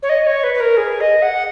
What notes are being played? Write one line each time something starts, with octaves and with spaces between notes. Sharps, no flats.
C#5
D#5
C#5
B4
B4
A#4
G#4
D#5
F#5